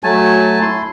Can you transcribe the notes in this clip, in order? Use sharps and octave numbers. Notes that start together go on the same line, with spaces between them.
F#3 A3 G#5 A5
E4 C6